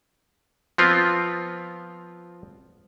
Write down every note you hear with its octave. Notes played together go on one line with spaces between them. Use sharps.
F3 B3 C4 F4